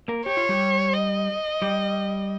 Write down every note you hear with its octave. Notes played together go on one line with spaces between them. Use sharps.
A#3 A#4
G4 C#5
F4
G3 G4
D#5
G3 G4